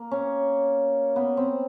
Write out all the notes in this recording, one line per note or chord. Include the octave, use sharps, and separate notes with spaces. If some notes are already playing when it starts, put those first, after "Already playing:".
Already playing: A#3
C#4
B3
C4